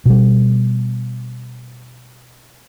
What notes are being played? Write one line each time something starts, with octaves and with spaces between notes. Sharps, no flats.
B2 G3